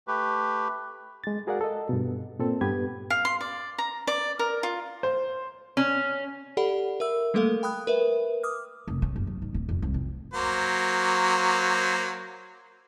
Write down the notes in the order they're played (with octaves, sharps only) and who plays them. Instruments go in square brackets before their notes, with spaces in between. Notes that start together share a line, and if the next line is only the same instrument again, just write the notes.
[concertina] A3 G4 B4
[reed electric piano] G#3 A6
F#4 G#4 A#4 D5 F5 F#5
A4 D#5
G2 B2
A#2 C4 A4
G2 B3 G4 B4 G#6
[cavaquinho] F5
C6
D5
A#5
D5
A#4
F4
[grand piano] C5
[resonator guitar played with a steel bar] C#4
[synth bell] G4 A4 D5 F#5 B5
A#4 E5 E6
G3 A3 A#3 A4 A#4 F5
G5 B5 D#6 F#6
A#4 B4 E5
D6 D#6 F6
[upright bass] F1
C#4
F#1
F#3
D#3
D1
F2
C2
F2
[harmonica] F#3 A#3 C5